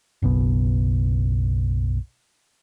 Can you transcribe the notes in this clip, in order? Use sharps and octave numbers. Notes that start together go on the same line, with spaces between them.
F#1 B1 B2